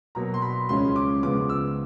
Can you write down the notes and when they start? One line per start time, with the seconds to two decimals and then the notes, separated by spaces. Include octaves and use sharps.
0.15 B2 F#3 A#3 A#5
0.34 C6
0.42 B5
0.69 C#2 C#3 F3 G#3 C#4 C6
0.96 D6
1.23 C#2 C#3 F3 G#3 B3 D6
1.49 E6